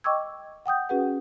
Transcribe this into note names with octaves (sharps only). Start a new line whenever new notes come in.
D#5 G5 C#6 D6 E6 G#6
F#5 G5 D#6 G6
C#4 F#4 G#4 B4 F#5